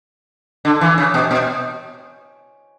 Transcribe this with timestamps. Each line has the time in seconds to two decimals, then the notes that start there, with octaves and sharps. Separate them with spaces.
0.65 D3
0.81 E3
0.98 C#3
1.14 B2
1.31 B2